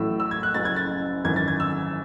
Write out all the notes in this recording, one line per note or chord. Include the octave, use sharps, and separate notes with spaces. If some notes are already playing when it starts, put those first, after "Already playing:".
Already playing: A1 A2 F#3 A3 E6
E6
G#6
F#6
F#1 F#2 C#3 F#3 A6
G#6
A6
G#1 F#2 E3 G#6
A6
G#6
E6